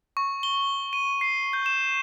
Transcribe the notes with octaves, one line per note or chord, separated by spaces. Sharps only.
C#6
G7
D#7
C7
G6
E7